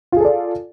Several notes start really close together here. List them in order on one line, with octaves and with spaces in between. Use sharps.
F4 G#4 A4 D5